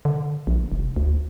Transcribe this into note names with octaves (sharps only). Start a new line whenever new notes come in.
D3
A#1
F1
D2